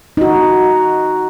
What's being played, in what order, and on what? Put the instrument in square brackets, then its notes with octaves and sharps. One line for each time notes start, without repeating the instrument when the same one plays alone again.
[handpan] D#4 F#4